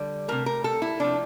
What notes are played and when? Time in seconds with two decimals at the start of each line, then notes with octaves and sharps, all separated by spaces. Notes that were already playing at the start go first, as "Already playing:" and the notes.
Already playing: D3 G3
0.28 C3 F3 A3 A#4
0.46 A#4
0.64 A4
0.82 E4
1.00 C3 F3 A3 D4